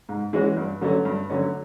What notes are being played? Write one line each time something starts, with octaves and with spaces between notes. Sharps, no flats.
G#2
E3 G#3 C#4 F#4
G2
D3 F#3 A3 C#4
G2
D3 F#3 A3 C#4